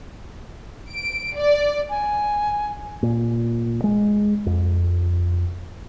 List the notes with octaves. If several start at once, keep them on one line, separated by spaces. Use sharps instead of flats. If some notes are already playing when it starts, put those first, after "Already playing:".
D7
D5
G#5
A#2
G#3
F2